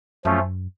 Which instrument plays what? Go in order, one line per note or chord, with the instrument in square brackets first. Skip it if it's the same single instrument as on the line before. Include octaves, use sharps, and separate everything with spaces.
[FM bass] F#2 [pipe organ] F3 A3 C#4 F4